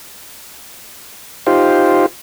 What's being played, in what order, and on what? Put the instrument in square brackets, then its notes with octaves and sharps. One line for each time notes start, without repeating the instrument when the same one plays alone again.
[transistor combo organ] D#4 F4 G4 C5